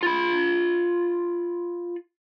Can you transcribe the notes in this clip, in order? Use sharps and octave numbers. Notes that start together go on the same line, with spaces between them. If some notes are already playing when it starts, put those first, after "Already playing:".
F4 B5